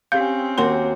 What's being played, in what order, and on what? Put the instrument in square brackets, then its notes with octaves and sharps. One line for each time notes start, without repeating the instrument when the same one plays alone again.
[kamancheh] C4 C#4 [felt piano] G4 G6 [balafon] F5
[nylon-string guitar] D#2 F#4 [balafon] A#4 C6